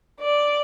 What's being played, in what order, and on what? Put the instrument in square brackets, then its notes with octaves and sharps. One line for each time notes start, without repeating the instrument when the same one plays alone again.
[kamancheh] D5